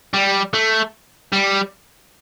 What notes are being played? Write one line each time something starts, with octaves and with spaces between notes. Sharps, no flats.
G3
A3
G3